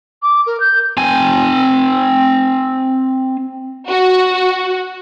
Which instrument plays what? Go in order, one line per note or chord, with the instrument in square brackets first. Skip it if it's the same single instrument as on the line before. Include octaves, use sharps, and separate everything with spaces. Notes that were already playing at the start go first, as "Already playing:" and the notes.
[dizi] D6
A#4
G6
[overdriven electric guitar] C4 G#5
[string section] F#4